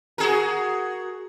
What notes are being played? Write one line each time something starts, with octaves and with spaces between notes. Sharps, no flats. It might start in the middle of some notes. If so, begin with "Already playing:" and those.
F#4 G#4 A#4